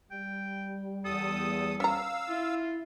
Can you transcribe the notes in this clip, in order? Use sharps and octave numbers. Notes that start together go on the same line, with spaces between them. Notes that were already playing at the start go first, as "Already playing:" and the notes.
G3 G5
E2 A4 D#6
C#4 F5 A#5 E6
E4 F4